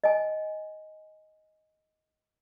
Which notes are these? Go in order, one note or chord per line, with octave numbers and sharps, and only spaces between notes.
D#5 G#5